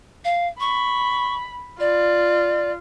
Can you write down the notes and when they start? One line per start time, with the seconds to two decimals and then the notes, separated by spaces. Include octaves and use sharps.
0.25 F5
0.60 B5 C#6
1.80 F4 D5